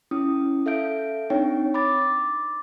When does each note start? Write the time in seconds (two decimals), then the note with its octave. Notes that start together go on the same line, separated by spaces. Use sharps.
0.11 C#4 E4 D#6
0.66 A4 E5 F5 G6 D7
1.30 C4 D4 D#4 C#5 G5
1.74 B5 D6 A6